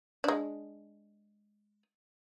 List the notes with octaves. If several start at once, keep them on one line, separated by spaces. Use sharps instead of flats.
G#3 D4